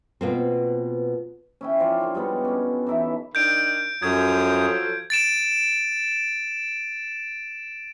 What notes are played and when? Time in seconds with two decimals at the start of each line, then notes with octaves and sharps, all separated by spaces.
0.21 B2 A#3 C4 F4 B4 C5
1.61 C#4 E4 G5
1.79 F3 F4 D5
2.00 D3 C#5 C#6
2.15 G3 G#3 B3 A4
2.45 C#4 D4
2.86 E3 D#4 E4 E5
3.35 D#3 D4 D#4 G6 D7
4.02 F#2 F3 F#3 A4 D#6 G#6
5.10 A6 D7 E7